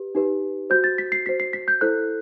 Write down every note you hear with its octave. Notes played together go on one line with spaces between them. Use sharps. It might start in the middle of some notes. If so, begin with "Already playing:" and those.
Already playing: G4 B4
D#4 G4 B4
F#4 C5 G6
A6
B6
C7
F#4 C5 B6
C7
B6
G6
E4 A4 C5 F#6